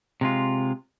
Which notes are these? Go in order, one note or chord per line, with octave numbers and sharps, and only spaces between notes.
C3 G#3 F4